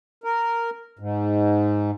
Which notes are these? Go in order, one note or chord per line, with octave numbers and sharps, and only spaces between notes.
A#4
G#2